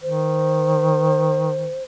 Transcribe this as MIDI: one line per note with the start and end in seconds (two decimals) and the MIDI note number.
0.03 1.76 51
0.03 1.83 72